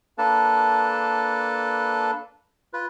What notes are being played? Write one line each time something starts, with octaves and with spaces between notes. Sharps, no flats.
A#3 D4 A4 B4 A5
F4 B4